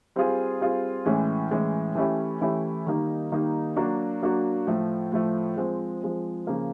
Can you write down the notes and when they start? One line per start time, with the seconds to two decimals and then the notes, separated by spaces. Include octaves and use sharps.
0.16 G3 C4 F4 G#4
0.60 G3 C4 F4 G#4
1.05 A2 E3 G#3 C#4
1.51 A2 E3 G#3 C#4
1.95 E3 A3 C#4 E4 G4
2.41 E3 A3 C#4 E4 G4
2.87 D#3 G3 A#3 D#4
3.32 D#3 G3 A#3 D#4
3.76 F#3 A#3 D4 F#4
4.22 F#3 A#3 D4 F#4
4.67 A2 F3 A3
5.12 A2 F3 A3
5.57 F3 G#3 C4
6.03 F3 G#3 C4
6.47 C#3 F3 A#3